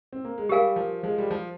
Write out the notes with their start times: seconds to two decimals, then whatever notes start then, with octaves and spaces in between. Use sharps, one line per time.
0.13 C4
0.25 A#3
0.38 G#3
0.49 G3 G4 A#4 F5 G#5
0.76 F3
1.03 F3 G#3
1.18 G3
1.31 F3